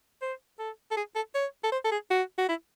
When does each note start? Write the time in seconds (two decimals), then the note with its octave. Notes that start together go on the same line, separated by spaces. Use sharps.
0.21 C5
0.59 A4
0.91 A4
0.97 G#4
1.15 A4
1.35 C#5
1.64 A4
1.72 C5
1.84 A4
1.92 G#4
2.10 F#4
2.38 F#4
2.49 E4